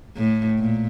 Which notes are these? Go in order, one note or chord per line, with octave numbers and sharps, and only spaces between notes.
A2
A#2